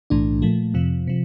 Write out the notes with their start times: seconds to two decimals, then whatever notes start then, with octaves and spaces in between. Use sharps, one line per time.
0.10 B1 A2 E3 A3 D4
0.42 A#2 F3 A3
0.74 F2 C3 F3
1.07 C3 F3